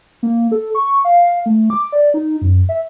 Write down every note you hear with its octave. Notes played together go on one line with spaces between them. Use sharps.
A#3
A4
C#6
F5
A3
D6
D5
D#4
F#2
E5